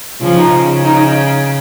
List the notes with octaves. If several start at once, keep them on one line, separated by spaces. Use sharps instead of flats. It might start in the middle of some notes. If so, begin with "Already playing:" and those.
C#3 F3
D#4
C#3
D#4